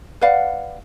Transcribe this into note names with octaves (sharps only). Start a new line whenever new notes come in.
B4 D5 F5 F#5